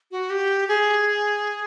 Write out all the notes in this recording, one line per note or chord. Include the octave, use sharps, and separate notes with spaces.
F#4
G4
G#4